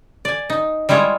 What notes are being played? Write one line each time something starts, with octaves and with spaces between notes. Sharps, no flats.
D5 G#5
D#4
G3 G#3 E4 F4 C#5